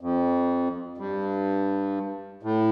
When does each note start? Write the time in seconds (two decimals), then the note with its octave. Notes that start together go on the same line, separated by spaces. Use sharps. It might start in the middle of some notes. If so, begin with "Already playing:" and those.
0.01 F2
0.98 G2
2.43 A2